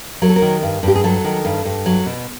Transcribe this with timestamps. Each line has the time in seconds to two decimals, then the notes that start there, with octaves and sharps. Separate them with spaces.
0.22 F#3 A#4
0.29 A4
0.36 A#4
0.42 D#3
0.63 G2
0.83 G2 G4
0.95 G#4
1.04 F#3 A4
1.24 D#3
1.45 G2
1.65 G2
1.86 F#3
2.06 B2